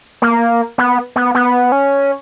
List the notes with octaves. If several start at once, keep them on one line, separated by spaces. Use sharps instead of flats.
A#3
B3
B3
B3
C#4